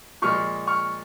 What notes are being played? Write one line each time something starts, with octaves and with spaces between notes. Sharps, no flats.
A#2 F3 G#3 C#6 F6
C#6 F6